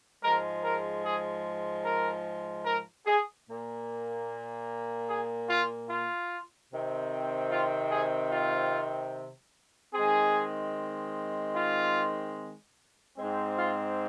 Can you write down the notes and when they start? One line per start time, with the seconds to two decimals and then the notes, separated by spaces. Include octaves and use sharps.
0.24 G#2 F3 G#3 A#4
0.64 A#4
1.05 G#4
1.85 A#4
2.66 A#4
3.06 G#4
3.48 A#2 A#3
5.10 G#4
5.50 F4
5.90 F4
6.70 C3 D#3 C4
7.51 F4
7.92 G#4
8.32 F4
9.94 D#3 G#3 C4 G#4
11.56 F4
13.18 G#2 G#3 C4
13.59 F4